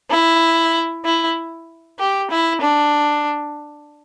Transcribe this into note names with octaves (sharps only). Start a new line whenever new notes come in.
E4
E4
G4
E4
D4